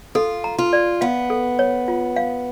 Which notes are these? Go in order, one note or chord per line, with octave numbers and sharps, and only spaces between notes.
F4 A4
A#5
F4
D5
B3 F5
A4
C#5
F4
F5